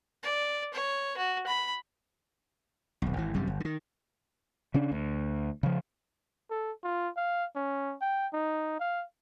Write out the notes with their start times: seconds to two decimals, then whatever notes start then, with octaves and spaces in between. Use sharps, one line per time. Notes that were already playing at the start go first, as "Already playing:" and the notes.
0.23 D5
0.74 C#5
1.17 F#4
1.47 B5
3.02 D#1 B1
3.16 G#1 E3
3.34 G#1 F#2 C3 G3
3.47 G1
3.60 D3 D#3
4.74 C#3 C#4 D4
4.92 D2
5.63 C#3 F3
6.51 A4
6.84 F4
7.17 F5
7.55 C#4
8.01 G5
8.33 D#4
8.80 F5